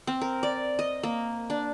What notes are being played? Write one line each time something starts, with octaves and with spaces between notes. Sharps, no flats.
C4
A#4
D5
D#5
A#3
D4